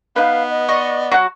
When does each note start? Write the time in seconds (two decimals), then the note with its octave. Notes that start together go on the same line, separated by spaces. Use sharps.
0.16 B3 D#4 B4 F5
0.49 D#5
0.68 D5 D#5 C6 C#6
1.11 F#3 F#4 F#5